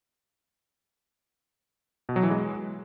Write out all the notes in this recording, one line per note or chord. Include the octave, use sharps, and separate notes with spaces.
B2
F#3
E3
G#3